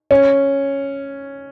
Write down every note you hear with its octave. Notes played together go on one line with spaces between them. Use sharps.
C#4